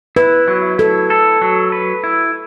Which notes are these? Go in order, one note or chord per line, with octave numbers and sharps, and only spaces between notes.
E4 B4
F#3
E4 A4
A4
F#3
B4
E4